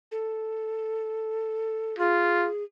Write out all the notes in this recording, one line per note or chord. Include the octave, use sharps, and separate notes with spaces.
A4
F4 G#4